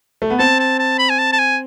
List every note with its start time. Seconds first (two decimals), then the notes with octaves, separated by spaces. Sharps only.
0.22 A3
0.30 B3
0.39 C4 A5
0.60 A5
0.79 A5
0.99 B5
1.10 G#5
1.19 A5
1.33 A5
1.39 G#5